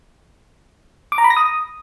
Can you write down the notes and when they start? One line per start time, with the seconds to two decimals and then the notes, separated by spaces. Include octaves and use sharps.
1.12 D6
1.18 A#5
1.24 B5
1.30 A#6
1.37 D#6